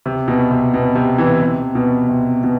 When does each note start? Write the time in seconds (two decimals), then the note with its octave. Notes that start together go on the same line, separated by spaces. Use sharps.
0.06 C3
0.28 B2
0.51 C3
0.74 B2
0.95 C3
1.18 E3
1.42 C3
1.75 B2
2.09 C3
2.43 B2